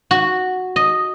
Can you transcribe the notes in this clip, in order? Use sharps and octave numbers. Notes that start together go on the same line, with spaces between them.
F#4
D#5